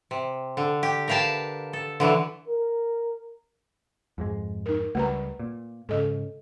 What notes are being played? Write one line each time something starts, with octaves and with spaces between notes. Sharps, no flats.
C3
D3
G4
A#4 B4 F5 G5 A5
A4
D3 E3 F#3
A#4
F2 G#2 G#3
D#4 A#4
C#2 G3 A3 B4 A#5
A#2
G#2 C#3 A4 D#5